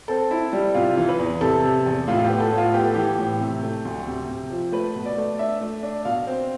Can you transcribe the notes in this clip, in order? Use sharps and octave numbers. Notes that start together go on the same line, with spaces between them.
C4 A4
E4
G3
C3 F4
E3
B4
E2
C3 A4
C3
E2
A2 F4
F4
G4
B3
A4
A2
F4
B3 G4
A4
E3 G4
A2
C3
A3
D2
C3
C3
F3
A3 B4
B2
D5
A3
D4 E5
A3
D4
B2 F5
C4